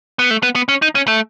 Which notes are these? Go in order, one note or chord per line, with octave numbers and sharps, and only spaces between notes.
B3
A3
B3
B3
C#4
D#4
C#4
A3